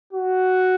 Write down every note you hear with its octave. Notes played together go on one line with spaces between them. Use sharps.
F#4